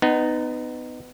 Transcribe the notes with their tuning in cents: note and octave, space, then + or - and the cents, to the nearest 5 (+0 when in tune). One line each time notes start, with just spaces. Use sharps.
B3 +20 D#4 -15